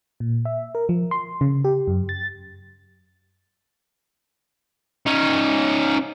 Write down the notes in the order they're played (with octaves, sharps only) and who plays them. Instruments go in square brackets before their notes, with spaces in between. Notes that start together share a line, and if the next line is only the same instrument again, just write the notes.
[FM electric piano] A#2
E5
A#4
F3
C6
C#3
G4
F#2
A6
[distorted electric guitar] C#4 D#4